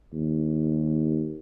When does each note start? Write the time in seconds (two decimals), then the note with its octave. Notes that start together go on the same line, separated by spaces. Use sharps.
0.13 D#2